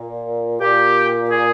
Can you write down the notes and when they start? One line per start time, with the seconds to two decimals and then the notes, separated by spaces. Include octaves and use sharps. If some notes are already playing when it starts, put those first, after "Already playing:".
Already playing: A#2
0.60 A#2 G4
1.30 G#4